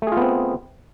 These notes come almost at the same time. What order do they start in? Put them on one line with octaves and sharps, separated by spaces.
A3 G#4 F4 B3 C4